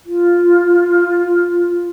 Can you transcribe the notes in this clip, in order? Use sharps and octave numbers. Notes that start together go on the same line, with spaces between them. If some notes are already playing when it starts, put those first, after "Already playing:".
F4